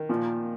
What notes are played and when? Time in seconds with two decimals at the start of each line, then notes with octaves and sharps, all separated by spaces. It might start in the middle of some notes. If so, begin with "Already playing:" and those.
Already playing: D#3
0.09 A#2 F3